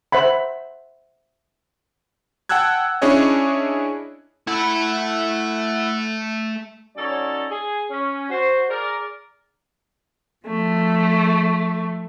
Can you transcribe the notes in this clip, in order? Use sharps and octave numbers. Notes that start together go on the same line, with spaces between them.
C5 E5 F#5 B5
F#5 G5 A5 E6 F#6 G#6
C#4 D4 E4 G#4 C#5 D#5
A3 E4 A4 F#5
F#3 C#4 D#4 A4 C#5 D5
G#4
C#4
F#4 C5
G#4 A#4 D5
F3 A3